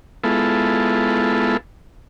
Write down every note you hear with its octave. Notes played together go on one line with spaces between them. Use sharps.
G#3 B3 E4 F4 A4